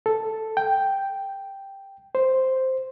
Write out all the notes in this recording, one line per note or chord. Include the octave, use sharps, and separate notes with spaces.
A4
G5
C5